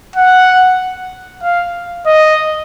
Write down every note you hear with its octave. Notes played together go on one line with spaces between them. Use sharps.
F#5
F5
D#5